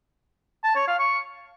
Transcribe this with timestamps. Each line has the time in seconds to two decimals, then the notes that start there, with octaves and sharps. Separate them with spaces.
0.64 A5
0.76 C#5
0.87 F5
0.99 C#6